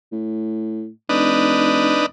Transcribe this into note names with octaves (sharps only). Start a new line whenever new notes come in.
A2
F1 D4 D#4 B4